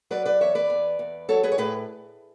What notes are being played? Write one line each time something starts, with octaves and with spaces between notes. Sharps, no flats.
F#3 B4 D5
B4 D5
E2 C#5 E5
B4 D5
E2
E2
F#3 A4 C#5
G#4 B4
C#5
A2 G#4 B4